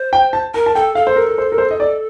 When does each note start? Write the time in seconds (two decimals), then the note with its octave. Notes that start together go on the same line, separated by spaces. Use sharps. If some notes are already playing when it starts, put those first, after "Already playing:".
Already playing: C5
0.13 G5
0.33 A5
0.54 A#4 A#5
0.66 A5
0.75 A4 G5
0.95 A4 F5
1.07 C5
1.16 A#4
1.29 A#4
1.38 C5
1.52 A#4
1.58 C5
1.71 D#5
1.80 D5